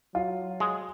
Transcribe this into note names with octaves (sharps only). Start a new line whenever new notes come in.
F#3 F4
G#3